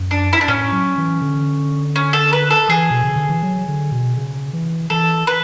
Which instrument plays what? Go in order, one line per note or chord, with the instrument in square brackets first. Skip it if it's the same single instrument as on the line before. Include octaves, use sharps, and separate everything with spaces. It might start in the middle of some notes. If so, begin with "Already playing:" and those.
Already playing: [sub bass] F#2
[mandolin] D4
E4
D4
[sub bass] A2 [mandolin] C#4
[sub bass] F#3
E3
D3
[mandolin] C#4
A4
B4
A4
[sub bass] E3 [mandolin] G#4
[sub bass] B2
C#3
D3
E3
F#3
D3
B2
C#3
E3
[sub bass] E3 [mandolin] A4
[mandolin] B4